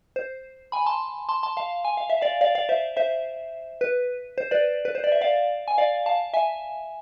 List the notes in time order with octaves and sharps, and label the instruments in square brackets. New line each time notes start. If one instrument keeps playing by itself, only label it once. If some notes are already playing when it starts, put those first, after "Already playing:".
[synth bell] C5
G#5 B5
A5 C6
A5 C6
A5 C6
F5 A5
G#5
F5
E5
D5 F5
D5 F5
D5 F5
C5 E5
C5 E5
B4
C5
B4 D5
B4
C5
D5
E5
D5 F5
G#5
D5 F5
F5 A5
E5 G#5